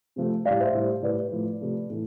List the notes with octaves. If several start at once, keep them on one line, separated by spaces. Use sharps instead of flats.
C3 F3 A3
A2 G3 D5 F5
C5 E5
A2 G3
A2 G3 B4 D5
A2 F3 A3
C3 F3 A3
A2 E3 A3